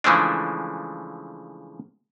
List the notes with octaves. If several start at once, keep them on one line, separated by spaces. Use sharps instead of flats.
C#3 E3 F3 G#3 A3 D4